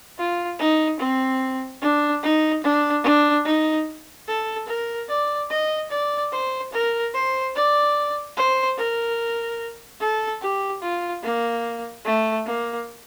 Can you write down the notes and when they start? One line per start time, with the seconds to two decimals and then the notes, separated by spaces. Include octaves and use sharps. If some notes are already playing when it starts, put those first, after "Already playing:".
0.18 F4
0.59 D#4
0.99 C4
1.82 D4
2.23 D#4
2.63 D4
3.04 D4
3.45 D#4
4.28 A4
4.68 A#4
5.09 D5
5.50 D#5
5.91 D5
6.32 C5
6.72 A#4
7.14 C5
7.55 D5
8.36 C5
8.77 A#4
10.00 A4
10.41 G4
10.82 F4
11.23 A#3
12.05 A3
12.46 A#3